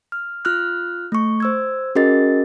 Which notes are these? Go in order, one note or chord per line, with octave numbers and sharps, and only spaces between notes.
F6
F4 F6 F#6
A3 C#6
C5 E6 G#6
C#4 F#4 G#4 A#4 D#5 A6